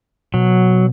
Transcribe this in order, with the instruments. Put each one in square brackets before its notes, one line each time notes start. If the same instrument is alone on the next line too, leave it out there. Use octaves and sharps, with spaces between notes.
[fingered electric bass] B2 [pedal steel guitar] F#3